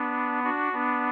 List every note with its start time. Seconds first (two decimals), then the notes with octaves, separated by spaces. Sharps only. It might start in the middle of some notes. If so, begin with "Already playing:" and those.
Already playing: B3 D4
0.44 D4 F#4
0.73 B3 D4